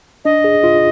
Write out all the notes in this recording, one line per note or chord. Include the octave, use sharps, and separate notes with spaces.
D4 D#5
G#4
F4